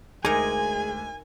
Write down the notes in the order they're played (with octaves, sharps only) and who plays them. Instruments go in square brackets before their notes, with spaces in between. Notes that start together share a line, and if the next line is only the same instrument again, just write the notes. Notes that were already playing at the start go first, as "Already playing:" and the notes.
[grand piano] D2 G#3 D6 [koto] D#4 A#4 [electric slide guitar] G#4 [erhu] G#5